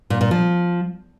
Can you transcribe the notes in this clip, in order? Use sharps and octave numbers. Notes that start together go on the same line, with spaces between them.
A#2
A#2
F3